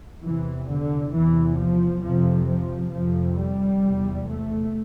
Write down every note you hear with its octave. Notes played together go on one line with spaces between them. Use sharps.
E2 C3 E3
D3
E2 C3 E3
F3
F2 C3 F3
F3
F2 C3 F3
G3
E2 C3
A3